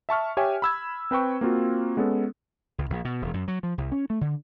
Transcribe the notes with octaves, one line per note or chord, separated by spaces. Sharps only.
E5 A5 C#6 F6
G4 C#5 E5 G5 G#5
B5 E6 G#6
C4 B4 G5 C#6
A#3 C4 F4 F#4
G#3 B3 C#4 A4
C#2
A#1
B2
E1
F#2
F#3
F3
C2
C#4
A3
D3